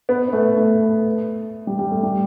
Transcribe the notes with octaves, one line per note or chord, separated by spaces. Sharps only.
B3
B3
A3
A3
G3
G3
A3
G3